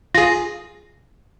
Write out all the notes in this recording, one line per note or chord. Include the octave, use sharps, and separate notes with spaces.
F4 G#4 A#6